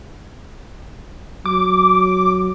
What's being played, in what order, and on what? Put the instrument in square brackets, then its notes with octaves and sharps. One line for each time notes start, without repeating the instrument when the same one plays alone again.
[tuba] F#3 [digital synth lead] D6